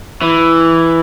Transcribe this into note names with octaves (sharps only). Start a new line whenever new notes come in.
E3